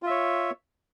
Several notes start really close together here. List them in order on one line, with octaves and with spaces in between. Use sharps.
F4 E5 C#5